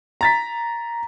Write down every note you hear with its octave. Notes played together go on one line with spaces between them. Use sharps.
A#5 A6 B6